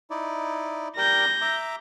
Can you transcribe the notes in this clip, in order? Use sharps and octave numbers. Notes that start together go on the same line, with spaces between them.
D#4 E4 D5
G4 A#4 D5 G6 A#6
E5 A#5 D6